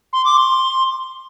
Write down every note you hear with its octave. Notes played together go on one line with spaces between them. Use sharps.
C6
D6
C6